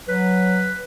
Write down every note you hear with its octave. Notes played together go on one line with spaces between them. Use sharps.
F#3 B4